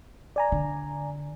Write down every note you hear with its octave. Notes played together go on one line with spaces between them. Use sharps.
D5 G#5 A#5
D3